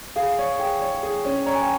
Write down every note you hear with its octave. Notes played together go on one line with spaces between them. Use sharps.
G#4 F5
C#5
G#4 G5
C#5
G#4
C#4
C#5 A#5
G#5
G5